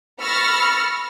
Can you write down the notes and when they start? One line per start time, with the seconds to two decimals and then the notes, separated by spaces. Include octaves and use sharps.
0.21 B5 C#6 E6 F6 A6 A#6